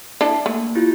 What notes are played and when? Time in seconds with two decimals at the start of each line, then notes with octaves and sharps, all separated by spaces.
0.21 D4 E4 A4
0.46 A3 A#3
0.75 E4 F4 G4